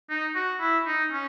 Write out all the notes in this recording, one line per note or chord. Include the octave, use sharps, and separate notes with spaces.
D#4
F#4
E4
D#4
C#4